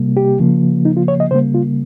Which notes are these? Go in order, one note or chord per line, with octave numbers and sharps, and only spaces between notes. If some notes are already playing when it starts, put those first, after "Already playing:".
Already playing: C3 G3 A#3
G4
C#3 F3 A#3
D#4
F4
C#5
D#5
C#3 G3 A#3 C5
F4